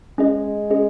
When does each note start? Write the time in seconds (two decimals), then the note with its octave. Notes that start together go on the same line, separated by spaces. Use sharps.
0.18 G#3 C#4 G#4 D#5
0.70 C#4 G#4 D#5